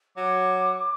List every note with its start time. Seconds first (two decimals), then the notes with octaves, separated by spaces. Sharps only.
0.17 F#3 D6